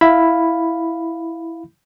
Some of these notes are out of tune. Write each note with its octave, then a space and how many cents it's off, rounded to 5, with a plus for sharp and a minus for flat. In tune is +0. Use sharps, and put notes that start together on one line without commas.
E4 +0 F5 +0 B5 +0